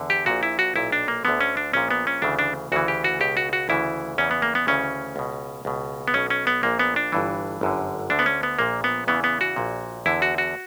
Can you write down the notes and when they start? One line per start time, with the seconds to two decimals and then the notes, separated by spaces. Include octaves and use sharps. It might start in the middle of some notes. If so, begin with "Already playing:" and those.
Already playing: E2 D3
0.10 G4
0.26 A#1 A#2 F#4
0.43 E4
0.59 F#4
0.75 B1 A#2 E4
0.92 D4
1.08 A#3
1.25 D2 D3 B3
1.41 C#4
1.57 D4
1.73 A#1 A#2 C#4
1.91 B3
2.07 C#4
2.22 D2 C#3 E3 D4
2.39 D4
2.72 D2 C#3 E3 F#4
2.88 G4
3.04 F#4
3.20 C#2 B2 G4
3.37 F#4
3.53 F#4
3.69 D2 C#3 E3 E4
4.18 E2 C#3 E3 C#4
4.31 B3
4.42 A#3
4.55 B3
4.67 D2 C#3 E3 C#4
5.16 C#2 B2
5.65 C#2 B2
6.08 B3
6.14 B1 B2 C#4
6.30 C#4
6.47 B3
6.63 A#1 A#2 A#3
6.79 B3
6.96 D4
7.12 G1 G2 E3
7.61 G1 F#2 D3
8.10 D2 D3 D4
8.19 B3
8.26 C#4
8.43 B3
8.59 A#1 A#2 A#3
8.84 B3
9.07 E2 C#3 E3 B3
9.24 B3
9.41 F#4
9.56 A#1 A#2
10.06 E2 D3 E4
10.22 F#4
10.38 F#4